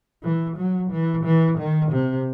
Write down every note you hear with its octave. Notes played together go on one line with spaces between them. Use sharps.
E3
F#3
E3
E3
D#3
C3